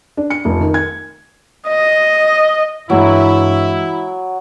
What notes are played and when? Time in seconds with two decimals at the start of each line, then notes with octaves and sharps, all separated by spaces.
0.17 D4
0.30 C#7
0.45 F1
0.61 D#3
0.74 G#6
1.68 D#5
2.90 G2 E3 F#3 G#3 E4